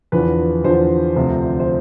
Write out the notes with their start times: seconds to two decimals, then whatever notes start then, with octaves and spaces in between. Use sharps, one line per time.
0.12 E2 D3 F3 B4
0.64 E2 D3 F3 C5
1.16 D2 C3 F3
1.60 C5